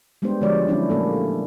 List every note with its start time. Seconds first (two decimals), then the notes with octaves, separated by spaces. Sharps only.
0.22 G3 G#3 B3 D4 G4 C5
0.41 D3 F3 G#3 F#4 C#5 D5
0.67 F#3 C#4 D4 E4
0.90 A#2 A3 A#3 A4